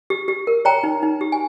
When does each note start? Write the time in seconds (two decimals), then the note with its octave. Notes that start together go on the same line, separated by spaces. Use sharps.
0.10 G4
0.28 G4
0.47 A#4
0.65 C#5 G5 A#5
0.83 D#4
1.03 D#4
1.21 G4
1.32 G#5